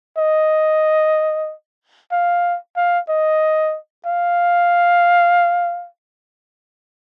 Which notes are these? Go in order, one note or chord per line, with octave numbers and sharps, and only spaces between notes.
D#5
F5
F5
D#5
F5